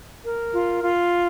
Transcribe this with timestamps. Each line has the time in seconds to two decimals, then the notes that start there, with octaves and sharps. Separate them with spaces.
0.22 A#4
0.53 F4
0.83 F4